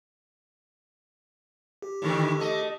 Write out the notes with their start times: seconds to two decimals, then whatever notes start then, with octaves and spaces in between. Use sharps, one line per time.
1.82 G4
2.02 A2 D3 D#3
2.40 A3 D#5